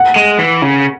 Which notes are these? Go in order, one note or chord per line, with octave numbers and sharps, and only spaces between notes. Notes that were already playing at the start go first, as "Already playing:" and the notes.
Already playing: F#5
G#3
E3
C#3